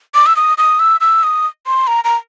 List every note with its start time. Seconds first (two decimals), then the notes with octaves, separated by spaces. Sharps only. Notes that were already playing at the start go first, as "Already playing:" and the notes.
0.15 D6
0.26 E6
0.36 D#6
0.58 D#6
0.79 E6
1.01 E6
1.23 D#6
1.67 C6
1.87 A#5
2.04 A#5